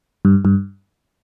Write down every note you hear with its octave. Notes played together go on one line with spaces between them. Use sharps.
G2
G2